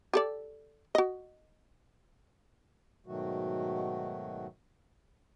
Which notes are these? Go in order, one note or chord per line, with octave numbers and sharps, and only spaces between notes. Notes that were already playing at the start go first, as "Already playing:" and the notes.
G4 A4 D5
F#4 D#5
G#2 B2 D#3 F#3 A3 F#4